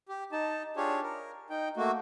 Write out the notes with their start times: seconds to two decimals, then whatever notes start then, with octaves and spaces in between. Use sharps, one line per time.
0.09 G4
0.32 D#4 A5
0.77 D4 F4 G4 G#4 C#5
1.03 A#4
1.50 D#4 G5
1.77 A3 A#3 F#4